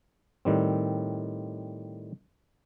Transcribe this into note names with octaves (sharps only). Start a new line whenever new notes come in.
A2 D#3 G3 C4